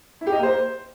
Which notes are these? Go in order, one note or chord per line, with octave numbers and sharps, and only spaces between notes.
E4
G4
D#5
A#3
C5